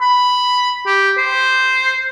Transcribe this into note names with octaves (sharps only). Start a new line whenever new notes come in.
B5
G4
C5